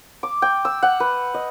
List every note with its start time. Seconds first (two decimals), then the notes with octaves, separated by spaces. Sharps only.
0.23 D6
0.42 G5
0.65 E6
0.83 F#5
1.00 B4
1.34 D#5